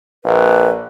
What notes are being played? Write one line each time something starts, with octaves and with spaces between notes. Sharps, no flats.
A#1 B4